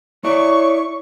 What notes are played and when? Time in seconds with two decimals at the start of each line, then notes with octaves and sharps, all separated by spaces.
0.24 E4 C#5 D5 C#6